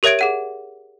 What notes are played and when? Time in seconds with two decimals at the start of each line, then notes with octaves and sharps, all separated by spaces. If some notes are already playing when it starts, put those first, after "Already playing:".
0.03 G4 A#4 C#5 E5 G#6 D7
0.19 G#4 F#5 D#7